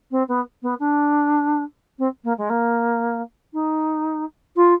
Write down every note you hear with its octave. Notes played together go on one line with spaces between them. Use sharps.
C4
B3
B3
D4
C4
A#3
G#3
A#3
D#4
F4